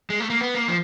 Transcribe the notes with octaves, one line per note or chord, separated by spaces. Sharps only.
G#3
A3
A#3
B3
A#3
F3